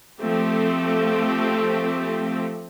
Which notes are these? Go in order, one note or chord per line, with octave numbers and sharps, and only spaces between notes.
F3 A3 C4 G4